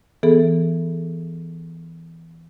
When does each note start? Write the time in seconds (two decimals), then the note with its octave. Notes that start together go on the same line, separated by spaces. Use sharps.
0.23 E3 B3 G#4 A4